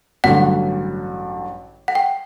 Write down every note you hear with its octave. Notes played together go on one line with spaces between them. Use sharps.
A1 G2 D3 F#3 F#5
F#5
G5